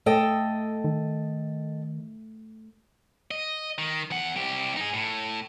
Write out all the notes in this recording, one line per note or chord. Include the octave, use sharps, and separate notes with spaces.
A3 A4 D#5 G5
D#3
D#5
D#3
E2 F#5
C2 G4
D#4 G#4
A2